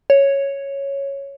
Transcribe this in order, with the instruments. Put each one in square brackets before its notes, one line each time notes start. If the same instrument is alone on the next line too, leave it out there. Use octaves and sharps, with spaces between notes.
[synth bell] C#5